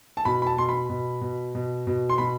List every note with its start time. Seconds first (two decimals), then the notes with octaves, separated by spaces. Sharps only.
0.17 A5
0.25 B2 B5
0.42 B5
0.47 A5
0.57 B2 C6
0.69 B5
0.89 B2
1.21 B2
1.55 B2
1.87 B2
2.10 C6
2.18 B2 B5